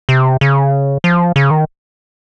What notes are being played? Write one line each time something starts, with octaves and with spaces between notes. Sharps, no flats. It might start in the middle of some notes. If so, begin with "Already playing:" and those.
C3
C#3
F3
C#3
D#3